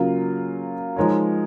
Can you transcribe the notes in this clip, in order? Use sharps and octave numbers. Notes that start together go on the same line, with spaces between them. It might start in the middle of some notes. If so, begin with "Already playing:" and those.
Already playing: C#3 F#3 A#3 F4
F3 G#3 D#4 A#4 C#5